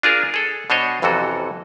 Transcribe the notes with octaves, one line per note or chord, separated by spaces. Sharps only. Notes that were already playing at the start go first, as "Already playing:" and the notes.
D4 F4 G#4 A#4
G#4 A4
B2 D4 C5 C#5 D#5
A1 F2 C3 E3 F#4 A4